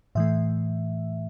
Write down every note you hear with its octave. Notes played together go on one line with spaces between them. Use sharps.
A2 E3 A3 E5